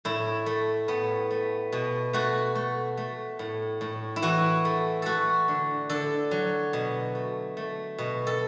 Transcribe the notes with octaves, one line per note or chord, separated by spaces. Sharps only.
A2 E4
A3
A2 B3
A3
B2
A3 F#4
A3
A3
A2
A2
E4
E3 F#4
A3
A3 F#4 A4
D3
D3 A4
F#3
B2
A3
A3
B2
A4